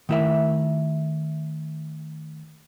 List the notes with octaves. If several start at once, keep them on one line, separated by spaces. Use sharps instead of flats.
D#3 A3 E4 A#4 E5